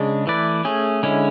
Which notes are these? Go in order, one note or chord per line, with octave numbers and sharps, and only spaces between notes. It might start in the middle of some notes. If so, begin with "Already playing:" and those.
Already playing: C#3 G#3 D4
E3 A3 E4 B4 D5
A3 C#4 G#4
D3 G#3 C#4 E4